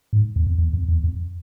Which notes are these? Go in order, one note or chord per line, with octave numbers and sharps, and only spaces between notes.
G#2
E2
F2
E2
F2
E2
F2